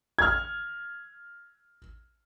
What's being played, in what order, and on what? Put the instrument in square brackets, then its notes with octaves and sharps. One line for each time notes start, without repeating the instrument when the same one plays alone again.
[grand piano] F6 G#6